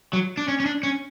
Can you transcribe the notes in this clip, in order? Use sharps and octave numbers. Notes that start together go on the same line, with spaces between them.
F#3
D4
C#4
C#4
D4
C#4